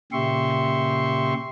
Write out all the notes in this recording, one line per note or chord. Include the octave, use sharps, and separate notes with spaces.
A#2 C#3 G4 E5 C6 C#6